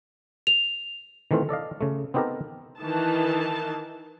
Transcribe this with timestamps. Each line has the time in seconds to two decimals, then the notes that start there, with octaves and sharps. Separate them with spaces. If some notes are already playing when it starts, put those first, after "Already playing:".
0.47 F7
1.31 D#3 E3 A3 C4 F4
1.49 A4 D5 D#5 F5
1.81 C#3 A3
2.14 B3 C4 D#4 G4 A4 A#4
2.79 D#3 E3 A5